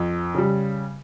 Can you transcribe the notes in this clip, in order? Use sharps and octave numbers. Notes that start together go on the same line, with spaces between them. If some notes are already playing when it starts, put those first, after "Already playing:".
Already playing: F2
C#3 G3